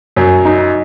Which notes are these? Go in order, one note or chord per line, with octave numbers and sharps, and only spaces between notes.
F#2
D#4